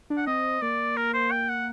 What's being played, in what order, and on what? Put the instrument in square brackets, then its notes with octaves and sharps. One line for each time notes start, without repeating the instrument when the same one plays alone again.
[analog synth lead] D4
[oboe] F#5
[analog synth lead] C4 [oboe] D#5
[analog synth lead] A#3 [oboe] D5
[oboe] A#4
C5
G5
F#5